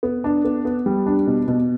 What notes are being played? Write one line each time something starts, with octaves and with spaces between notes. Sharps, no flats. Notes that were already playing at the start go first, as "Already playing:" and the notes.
B3
D4
B3
B3
G3
D4
B2
B2